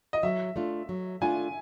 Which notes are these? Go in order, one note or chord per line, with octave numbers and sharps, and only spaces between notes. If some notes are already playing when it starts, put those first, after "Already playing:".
D#5
F#3 E5
A3 D4 F4
F#3
A3 D4 F4 G#5